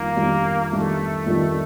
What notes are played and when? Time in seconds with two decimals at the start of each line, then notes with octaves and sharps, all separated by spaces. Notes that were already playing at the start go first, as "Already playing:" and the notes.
Already playing: F2 D#3 G3 A#3 D4
0.16 F2 D#3 G3 D4
0.71 F2 D#3 G3 A3 D4
1.26 F2 D#3 G3 D4